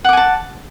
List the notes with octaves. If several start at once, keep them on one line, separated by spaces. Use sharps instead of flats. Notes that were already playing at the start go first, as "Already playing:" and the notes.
F#5 G#5 A5 D6